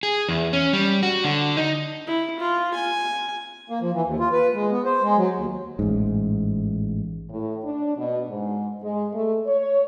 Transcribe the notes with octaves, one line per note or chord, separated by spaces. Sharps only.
G#4
E2
C#4
G3
F#4
D3
D#4
E4
F4
G#5
A#3
F3
E3
D#2
F4
B4
G#3
B3
C5
G#3
F#3
D#2
A1 G#2
A2
D4
B2
G#2
G#3
A3
C#5